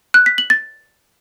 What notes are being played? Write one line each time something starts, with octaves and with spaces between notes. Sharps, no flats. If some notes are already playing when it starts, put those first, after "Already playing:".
F#6
B6
F#7
A6